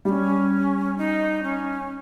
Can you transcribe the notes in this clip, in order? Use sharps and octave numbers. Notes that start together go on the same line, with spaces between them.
G3 C#4 D#4
D#4
C#4